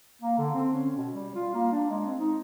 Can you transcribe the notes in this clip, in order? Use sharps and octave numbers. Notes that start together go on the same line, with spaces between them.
A#3
D3
C4
C#4
B2
G3
F4
A#3
D4
G#3
C4
D#4